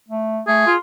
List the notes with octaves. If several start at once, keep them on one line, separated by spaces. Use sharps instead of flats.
A3
A3 G#4
F4